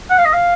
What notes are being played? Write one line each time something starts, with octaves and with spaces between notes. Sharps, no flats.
F#5
F5
D#5
F5